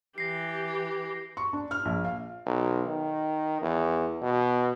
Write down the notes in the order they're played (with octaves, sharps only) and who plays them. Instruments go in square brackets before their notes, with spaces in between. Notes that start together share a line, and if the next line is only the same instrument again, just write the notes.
[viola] E3 G4 [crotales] A#6 C7
[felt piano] C#6
D4
F6
A#1
F5
[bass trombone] B1
D#3
E2
B2